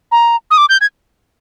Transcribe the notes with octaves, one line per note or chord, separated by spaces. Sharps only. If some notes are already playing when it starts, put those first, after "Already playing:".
A#5
D#6
D6
G6
G#6